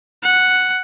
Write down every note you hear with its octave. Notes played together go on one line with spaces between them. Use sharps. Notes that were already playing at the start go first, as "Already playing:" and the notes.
F#5